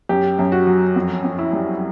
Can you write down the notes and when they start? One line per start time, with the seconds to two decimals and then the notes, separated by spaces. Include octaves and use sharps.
0.09 F#2 G4
0.39 F#2
0.52 F#4
0.67 F#3
0.96 F2
1.24 F2
1.39 E4
1.53 G3